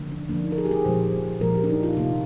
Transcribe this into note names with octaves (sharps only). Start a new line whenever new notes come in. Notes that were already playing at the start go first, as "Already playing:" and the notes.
Already playing: D3 F3 A#3
D4
D3 F3 A#3 D4
D#4
A#4
G#4
G4
G#4
A#2 F3 G#3 C5
A#2 F3 G#3 A#4
G4
D4
D#4
F4
C3 D#3 A#3 F4